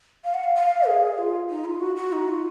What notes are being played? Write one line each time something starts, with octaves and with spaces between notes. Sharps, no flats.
F5
F#5
F5
F5
G#4
F4
D#4
F4
F#4
F#4
D#4
F4